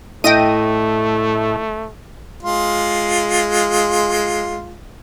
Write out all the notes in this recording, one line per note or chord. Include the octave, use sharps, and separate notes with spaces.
A2 A3 E4 D#5 G5 A#6 D#7
G#3 F4